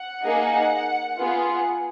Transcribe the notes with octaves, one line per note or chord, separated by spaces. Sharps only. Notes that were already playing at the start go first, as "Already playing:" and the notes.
Already playing: F#5
A#3 D#4 G#4
B3 F4 G#4